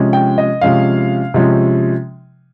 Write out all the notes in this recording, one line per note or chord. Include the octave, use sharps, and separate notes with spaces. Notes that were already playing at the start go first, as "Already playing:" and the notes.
Already playing: C3 F3 G#3 C#4
G5
D#5
C3 F3 G#3 C#4 F5
C3 F3 G#3 C#4